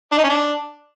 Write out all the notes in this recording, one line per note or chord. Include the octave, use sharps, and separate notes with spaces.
D4
D#4
C#4
D4